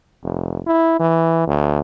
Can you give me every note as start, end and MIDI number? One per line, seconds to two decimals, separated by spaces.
0.23 0.60 29
0.67 0.99 64
1.00 1.44 52
1.47 1.79 38